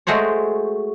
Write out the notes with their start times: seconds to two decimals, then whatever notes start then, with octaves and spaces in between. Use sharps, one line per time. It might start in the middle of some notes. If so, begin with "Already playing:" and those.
0.07 G#3 A3 F#4 C5 C#5